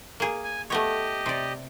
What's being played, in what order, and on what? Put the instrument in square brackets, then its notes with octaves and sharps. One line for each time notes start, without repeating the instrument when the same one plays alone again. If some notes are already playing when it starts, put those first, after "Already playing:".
[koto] A#3 G#4
[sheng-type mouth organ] G#5
[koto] A3 B3 C#5 [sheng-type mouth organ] G4 D#5
[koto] C3 D5